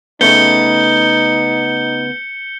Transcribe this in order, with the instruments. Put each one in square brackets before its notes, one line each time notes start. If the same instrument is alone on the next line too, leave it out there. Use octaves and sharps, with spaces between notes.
[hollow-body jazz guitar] C#3 A3 B3 [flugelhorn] D#4 [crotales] G6 C#7 G7